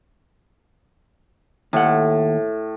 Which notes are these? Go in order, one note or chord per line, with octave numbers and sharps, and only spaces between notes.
D#2 A2 F#5